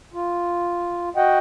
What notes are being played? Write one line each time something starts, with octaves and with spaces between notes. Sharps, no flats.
F4
F#4 D#5 F#5 G5